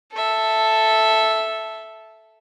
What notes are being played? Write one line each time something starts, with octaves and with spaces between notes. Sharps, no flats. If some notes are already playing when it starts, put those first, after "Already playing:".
A4 E5